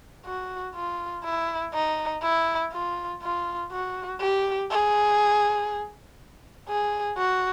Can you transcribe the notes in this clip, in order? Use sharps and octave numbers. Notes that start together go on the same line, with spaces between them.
F#4
F4
E4
D#4
E4
F4
F4
F#4
G4
G#4
G#4
F#4